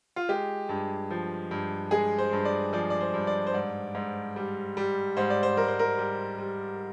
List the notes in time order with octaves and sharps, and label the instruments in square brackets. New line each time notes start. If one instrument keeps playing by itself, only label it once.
[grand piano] F4
G#3 G4
G2
F3
G2
G#3 G#4
C5
G2
D5
F3 D5
D5
C5
G2
D5
C5
G#2 D5
G#2
G3
G3
G#2 C5
D5
C5
G#2 A#4
C5
A#4
G3
G3